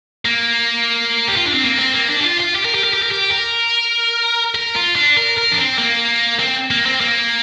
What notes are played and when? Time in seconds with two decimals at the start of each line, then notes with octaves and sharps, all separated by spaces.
0.25 A#3
1.28 G4
1.37 F4
1.46 D4
1.54 C4
1.64 A#3
1.78 C4
1.94 A#3
2.09 D4
2.21 G4
2.25 F4
2.40 F4
2.55 G4
2.65 A#4
2.75 G4
2.84 A#4
2.93 G4
3.03 A#4
3.12 G4
3.32 A#4
4.55 A#4
4.76 F4
4.96 D4
5.17 A#4
5.37 A#4
5.51 D4
5.58 C4
5.78 A#3
6.40 C4
6.71 A#3
6.86 C4
7.01 A#3